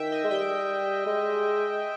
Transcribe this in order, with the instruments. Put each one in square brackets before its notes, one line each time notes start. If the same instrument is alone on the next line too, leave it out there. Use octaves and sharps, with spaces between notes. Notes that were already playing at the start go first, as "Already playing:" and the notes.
Already playing: [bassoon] D#3 [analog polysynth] E5 G5
[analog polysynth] D#5
[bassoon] G#3
[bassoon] G3 [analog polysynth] G5
[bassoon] G#3